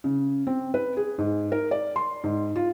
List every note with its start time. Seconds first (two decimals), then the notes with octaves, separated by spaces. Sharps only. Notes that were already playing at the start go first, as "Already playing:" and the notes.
0.04 C#3
0.47 C4
0.74 B4
0.97 G#4
1.18 G#2
1.52 A#4
1.71 D5
1.96 C6
2.24 G#2
2.56 F4